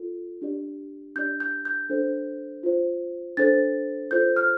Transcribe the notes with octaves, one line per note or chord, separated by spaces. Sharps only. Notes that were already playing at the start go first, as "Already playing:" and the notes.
Already playing: F4 A4
D4 G4 D5
D4 G4 D5 G6
G6
G6
D4 A4 C5
F4 C5
D4 A4 C5 A6
F4 A4 C5 G6
F6